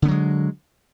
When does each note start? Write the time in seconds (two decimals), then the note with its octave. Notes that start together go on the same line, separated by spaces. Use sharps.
0.02 D3
0.05 B3
0.08 F#3
0.11 G#3